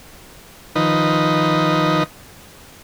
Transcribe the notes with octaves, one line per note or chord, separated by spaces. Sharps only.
D#3 F3 D#4 B4